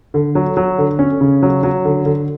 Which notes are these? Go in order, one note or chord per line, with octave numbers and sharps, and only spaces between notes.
D3
F#3
F#3
D3
C#4
C#3
F#3
F#3
D3
D3